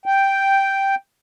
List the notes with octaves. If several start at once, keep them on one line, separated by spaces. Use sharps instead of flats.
G5